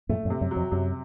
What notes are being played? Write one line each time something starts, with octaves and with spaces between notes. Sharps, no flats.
F#2 A#2 A3
F#2 A#2
C3
F#2
F#3
F2
F#2 C3